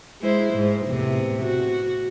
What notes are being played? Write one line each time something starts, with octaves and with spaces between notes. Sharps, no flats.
G#3 E4 C5
G#2
E2 A2 C3
F#4